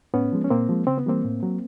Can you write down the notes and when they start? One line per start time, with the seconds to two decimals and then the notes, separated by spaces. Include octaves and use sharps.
0.14 A2 B3 C#4
0.32 F3 G#3
0.44 C#4
0.50 A#2 A#3 C4
0.69 F3 G#3
0.87 C#3 C4
0.98 B3
1.06 E3 G3 A#3 C4
1.24 A2
1.43 F#3